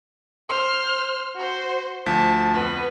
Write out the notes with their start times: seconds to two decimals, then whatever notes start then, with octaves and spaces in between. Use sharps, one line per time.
0.50 C5 C6 F6
1.36 F#4 C5
2.06 D2 F3 A5 B6
2.54 F2 B3 B4